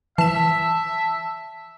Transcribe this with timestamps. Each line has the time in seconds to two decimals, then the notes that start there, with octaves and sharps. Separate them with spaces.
0.18 E3 E5 A5 E7